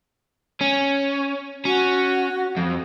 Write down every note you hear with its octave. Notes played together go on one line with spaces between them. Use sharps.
C#4
C#4 F#4
F2